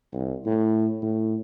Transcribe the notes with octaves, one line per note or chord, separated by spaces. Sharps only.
C2
A2
A2